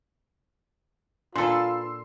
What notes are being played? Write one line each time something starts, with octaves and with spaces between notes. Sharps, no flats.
A#2 D4 F4 A4 B4 C6 E6